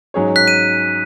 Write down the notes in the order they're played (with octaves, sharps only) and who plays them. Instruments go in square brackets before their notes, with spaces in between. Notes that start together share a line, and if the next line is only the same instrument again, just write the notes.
[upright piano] G#2 F#3 C#4 G#4 C#5
[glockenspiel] F#6 B6
D#7